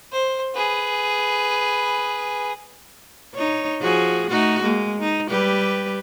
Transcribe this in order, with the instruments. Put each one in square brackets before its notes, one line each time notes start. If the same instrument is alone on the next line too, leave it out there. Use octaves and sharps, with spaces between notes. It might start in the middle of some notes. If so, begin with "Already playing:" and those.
[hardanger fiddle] C5
G#4 B4
[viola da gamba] D#4 C#5
F3 F#4 G#4
A3 D#4 F#4
G#3 A#3
D#4
G3 G4 B4